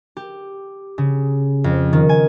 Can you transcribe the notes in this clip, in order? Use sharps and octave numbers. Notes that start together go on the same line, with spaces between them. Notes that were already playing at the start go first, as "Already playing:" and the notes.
G4
C#3
F2
D#3
G#5